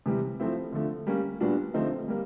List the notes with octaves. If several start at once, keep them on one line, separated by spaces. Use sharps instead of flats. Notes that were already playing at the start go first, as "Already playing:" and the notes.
C3 E3 G3
F3 A3 C4 E4
D3 F3 A3
G3 A#3 C#4
A#2 G3 B3 D4 F#4
D3 F3 A3 C4 D#4
G3 A#3